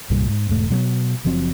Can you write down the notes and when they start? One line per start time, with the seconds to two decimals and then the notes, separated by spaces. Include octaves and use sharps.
0.10 C2 G2 A#2 G3
0.28 G#2
0.49 E1 G#2 A3
0.70 B2 F#3 G#3 B3
1.25 F#1 F3 F#3 C4